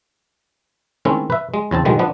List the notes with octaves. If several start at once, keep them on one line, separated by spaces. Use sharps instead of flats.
D#3 G#3 A3 C4 C#4 E4
B4 E5
G#3
E2 C#3 C4 A5
B2 D3 D#3 F3 G3 G#3
F3 B3 D4